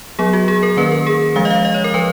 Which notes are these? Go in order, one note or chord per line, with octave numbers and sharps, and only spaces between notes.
F#3 B3 G#4
F#4
G#4
A#4
D#3 A#3 C#4 B4
A#4
G#4
F3 G#3 C#4 F5
D#5
F5
D#5
C#5
A#4
F3 B4